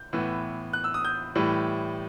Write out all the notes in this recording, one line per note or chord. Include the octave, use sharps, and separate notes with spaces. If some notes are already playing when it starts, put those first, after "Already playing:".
Already playing: G6
A2 E3 B3
F#6
E6
D#6
G6
A2 E3 G3